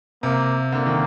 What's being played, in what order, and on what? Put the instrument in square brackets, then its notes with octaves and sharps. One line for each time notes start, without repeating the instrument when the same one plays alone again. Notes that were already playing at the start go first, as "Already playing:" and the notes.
[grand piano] C3 [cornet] A#3
[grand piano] D3 [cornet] A#3
[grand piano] D#3